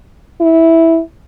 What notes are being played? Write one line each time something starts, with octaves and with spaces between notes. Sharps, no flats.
E4